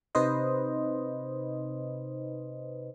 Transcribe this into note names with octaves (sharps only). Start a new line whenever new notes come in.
C3 D#4 B4 C5 D#5